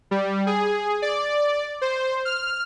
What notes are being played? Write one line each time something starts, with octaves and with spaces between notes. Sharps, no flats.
G3
G#4
D5
C5
F6